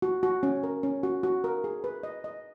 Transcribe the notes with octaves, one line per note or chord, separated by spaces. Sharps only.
F#4
F#4
C#4
A#4
C#4
F#4
F#4
A#4
G#4
B4
D#5
D#5